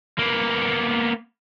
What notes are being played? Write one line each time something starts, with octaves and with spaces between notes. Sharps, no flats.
A#3 B3